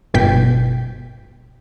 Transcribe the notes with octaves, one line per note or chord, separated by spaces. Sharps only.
G1 G#2 B2 G5 G6 B6